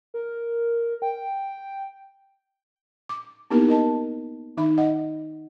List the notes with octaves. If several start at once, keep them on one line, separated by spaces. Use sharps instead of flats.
A#4
G5
D6
A#3 B3 D#4 E4 G4 A#4
A#4 D#5 A5
D#3 D#4 E5 B5
D#5 F#5